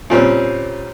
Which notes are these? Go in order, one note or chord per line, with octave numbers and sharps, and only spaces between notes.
A#2 G3 C4 C#4